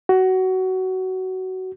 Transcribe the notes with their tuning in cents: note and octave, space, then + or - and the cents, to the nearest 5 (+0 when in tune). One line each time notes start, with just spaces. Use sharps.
F#4 +20